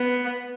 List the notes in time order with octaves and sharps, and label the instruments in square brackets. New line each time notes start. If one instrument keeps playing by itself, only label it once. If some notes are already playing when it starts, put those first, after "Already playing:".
Already playing: [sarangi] B3